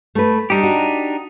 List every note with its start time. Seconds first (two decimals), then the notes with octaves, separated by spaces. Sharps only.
0.15 A3 B4
0.50 G3 D4 D#4 G4
0.63 F#4